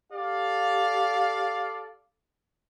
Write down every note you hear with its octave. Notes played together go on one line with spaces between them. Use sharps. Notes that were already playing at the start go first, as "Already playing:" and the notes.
G4 A4 D5 F5